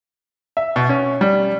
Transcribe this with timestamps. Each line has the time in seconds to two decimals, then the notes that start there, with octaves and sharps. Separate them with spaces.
0.57 E5
0.76 B2
0.89 C#4
1.21 G3